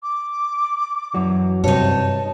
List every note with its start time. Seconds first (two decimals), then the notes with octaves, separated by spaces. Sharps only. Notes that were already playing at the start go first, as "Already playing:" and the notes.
0.03 D6
1.14 F#2 E3 F#3
1.64 G2 C3 D#4 C#5 A5